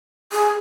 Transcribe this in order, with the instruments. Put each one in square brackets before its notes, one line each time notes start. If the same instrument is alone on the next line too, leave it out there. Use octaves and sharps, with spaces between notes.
[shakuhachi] G#4